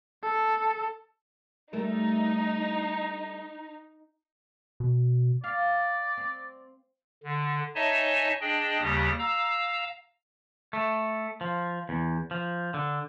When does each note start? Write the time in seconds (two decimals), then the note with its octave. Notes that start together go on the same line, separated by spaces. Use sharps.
0.23 A4
1.73 G3 A3 D#4 A#4
4.80 B2
5.44 D5 F5
6.17 C4
7.24 D3
7.75 D#4 C#5 D#5 E5 G#5 A5
8.41 D4 G#4 D#5 G5
8.81 D#2 C#3 G3 G4 D#6 A#6
9.19 F5 A#5 E6
10.73 A3
11.41 F3
11.89 E2
12.31 F3
12.74 D3